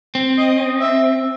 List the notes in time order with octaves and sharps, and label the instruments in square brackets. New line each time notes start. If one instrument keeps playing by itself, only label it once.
[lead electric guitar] C4
[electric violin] D#5
E5